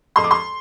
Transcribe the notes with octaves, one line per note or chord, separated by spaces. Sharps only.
F2 C6
D6
C6